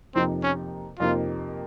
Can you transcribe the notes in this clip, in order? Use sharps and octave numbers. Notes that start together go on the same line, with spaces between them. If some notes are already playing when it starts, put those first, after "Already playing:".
F2 C3 F3 A#3 C4 D#4
C#4
F2 C3 F3 A#3 D#4 F4